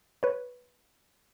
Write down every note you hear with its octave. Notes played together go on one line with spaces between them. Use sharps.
B4 C#5